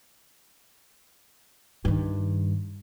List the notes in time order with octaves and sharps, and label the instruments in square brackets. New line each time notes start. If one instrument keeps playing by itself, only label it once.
[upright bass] G2 D#3